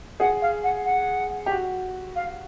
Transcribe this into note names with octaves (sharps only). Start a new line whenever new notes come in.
G#4 F#5
F5
F#5
F#5
G4
F#4
F5